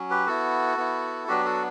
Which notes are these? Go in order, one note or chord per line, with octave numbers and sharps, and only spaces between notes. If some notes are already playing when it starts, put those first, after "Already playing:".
Already playing: F#3 C#4
G4 B4
B3 E4 F#4 A4
B3 E4
F#3 B3 D4 F#4 G4
F#4 A4